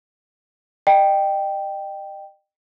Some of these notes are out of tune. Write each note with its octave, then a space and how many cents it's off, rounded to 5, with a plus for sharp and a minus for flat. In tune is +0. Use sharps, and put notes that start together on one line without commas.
D#5 -40 G5 +0